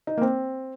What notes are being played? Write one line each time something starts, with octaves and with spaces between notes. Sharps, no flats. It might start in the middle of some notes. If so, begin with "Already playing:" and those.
D#4
A#3
C4